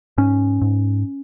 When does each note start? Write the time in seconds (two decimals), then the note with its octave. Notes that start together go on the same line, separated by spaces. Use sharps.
0.18 G#2 C#4
0.62 G#2